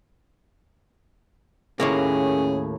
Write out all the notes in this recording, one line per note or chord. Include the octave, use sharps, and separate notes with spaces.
D#2 A2 A#3 C#4 G#4